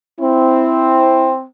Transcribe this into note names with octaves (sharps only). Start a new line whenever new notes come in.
C4 E4